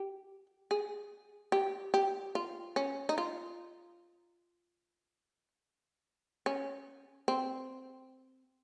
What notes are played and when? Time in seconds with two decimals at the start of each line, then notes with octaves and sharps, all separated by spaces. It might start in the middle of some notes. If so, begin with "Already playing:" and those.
Already playing: G4
0.71 G#4
1.52 G4
1.94 G4
2.35 F4
2.76 C#4
3.09 D#4
3.18 F4
6.46 C#4
7.28 C4